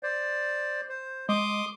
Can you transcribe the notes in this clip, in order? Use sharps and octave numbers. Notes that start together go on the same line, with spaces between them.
C5 D5
C5
G#3 C6 D6 D#6